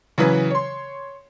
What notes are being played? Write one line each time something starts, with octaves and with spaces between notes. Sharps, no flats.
C#3 E3 F#3 B4
C#5 C6